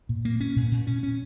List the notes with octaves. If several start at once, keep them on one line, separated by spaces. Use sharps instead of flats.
A#2
A#3
C#4
A#2
A#2
C#4
C#4